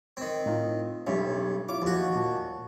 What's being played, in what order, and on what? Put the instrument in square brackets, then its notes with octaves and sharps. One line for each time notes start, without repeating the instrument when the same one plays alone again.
[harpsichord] D#3 C4
[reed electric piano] A2 D#4 F4
[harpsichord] B1 G2 [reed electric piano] C#4 C#5 E5
[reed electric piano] E4 F4 C#5 [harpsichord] D6
[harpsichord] D#2 F#4 [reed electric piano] F3
[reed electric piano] A#2 A5